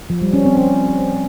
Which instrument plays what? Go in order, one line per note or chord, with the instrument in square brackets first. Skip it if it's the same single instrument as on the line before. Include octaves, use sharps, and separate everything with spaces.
[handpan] F3
G3
C#4
C4
C#4